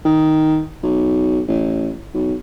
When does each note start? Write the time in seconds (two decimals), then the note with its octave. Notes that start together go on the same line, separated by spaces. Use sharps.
0.05 D#3
0.83 B1
1.48 A1
2.14 B1